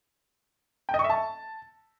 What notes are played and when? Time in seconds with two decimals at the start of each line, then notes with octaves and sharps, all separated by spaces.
0.89 G5
0.94 D#5
0.99 C#6
1.04 E5
1.10 A5